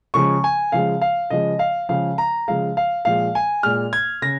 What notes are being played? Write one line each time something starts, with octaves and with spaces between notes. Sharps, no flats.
C#3 F3 G#3 C#6
G#5
C#3 F3 G#3 F5
F5
C#3 F3 G#3 D#5
F5
C#3 F3 G#3 F5
A#5
C#3 F3 G#3 F5
F5
A#2 F3 G#3 F5
G#5
A#2 G#3 F6
G#6
C#3 A#6